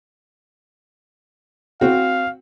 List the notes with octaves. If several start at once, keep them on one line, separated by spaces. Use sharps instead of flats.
C4 F#4 F5